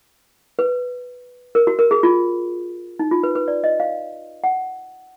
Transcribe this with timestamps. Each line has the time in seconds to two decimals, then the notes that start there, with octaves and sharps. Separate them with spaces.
0.59 B4
1.55 A#4
1.67 F#4
1.79 A#4
1.91 G#4
2.03 F4
2.99 D#4
3.11 F4
3.23 B4
3.35 B4
3.48 D5
3.64 D#5
3.80 F5
4.44 F#5